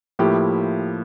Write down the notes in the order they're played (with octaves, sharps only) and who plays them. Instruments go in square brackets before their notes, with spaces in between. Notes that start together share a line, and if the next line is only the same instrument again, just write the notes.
[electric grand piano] A2 F3 A#3 E4 [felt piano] G4